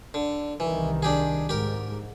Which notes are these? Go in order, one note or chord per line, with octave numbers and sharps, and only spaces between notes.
D3
C2 D#3 E3
D4 G4 G#4
G#2 G4 A#4